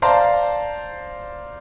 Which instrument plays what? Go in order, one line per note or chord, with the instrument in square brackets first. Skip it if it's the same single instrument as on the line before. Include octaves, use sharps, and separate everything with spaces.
[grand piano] C5 D5 F5 A5 A#5 C6